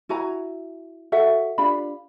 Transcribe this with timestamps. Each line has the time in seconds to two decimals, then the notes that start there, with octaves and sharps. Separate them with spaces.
0.09 E4 F#4 G#5 A#5
1.12 F#4 A4 E5 F#5
1.58 D4 F4 G4 B5